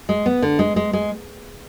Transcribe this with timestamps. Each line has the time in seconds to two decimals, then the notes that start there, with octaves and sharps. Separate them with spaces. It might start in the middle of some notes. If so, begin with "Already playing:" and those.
0.09 G#3
0.26 B3
0.42 D3
0.59 G#3
0.76 G#3
0.93 G#3